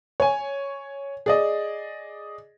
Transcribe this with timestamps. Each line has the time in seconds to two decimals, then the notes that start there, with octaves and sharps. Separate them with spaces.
0.20 C#5 G#5
1.26 G#4 D5 D#5